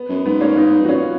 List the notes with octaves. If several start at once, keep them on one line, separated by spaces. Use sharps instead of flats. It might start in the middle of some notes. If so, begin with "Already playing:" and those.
Already playing: B3
F#2
G#2 B3
A#3 C#4
B3 D#4
F2
F#4
F#2 C#4 F4